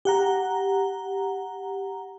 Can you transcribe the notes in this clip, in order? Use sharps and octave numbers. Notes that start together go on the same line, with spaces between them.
G4 F#5 A#5